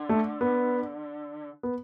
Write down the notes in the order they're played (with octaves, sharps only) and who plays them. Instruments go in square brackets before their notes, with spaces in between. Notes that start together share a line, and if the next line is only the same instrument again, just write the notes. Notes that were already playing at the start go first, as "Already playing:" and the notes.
Already playing: [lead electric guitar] D3
[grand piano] A3
B3
B3